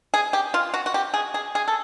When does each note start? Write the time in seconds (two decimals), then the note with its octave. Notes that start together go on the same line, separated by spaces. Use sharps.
0.14 G#4
0.33 G4
0.54 F4
0.74 F#4
0.86 F#4
0.94 G4
1.14 G#4
1.34 G#4
1.55 G#4
1.68 A4